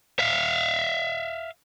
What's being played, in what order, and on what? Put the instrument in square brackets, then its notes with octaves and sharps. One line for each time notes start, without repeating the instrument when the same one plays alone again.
[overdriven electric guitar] E5 F5